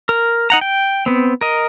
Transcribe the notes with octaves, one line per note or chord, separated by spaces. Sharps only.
A#4
D#4 F#5 A#5
G5
B3 C4
A#4 D#5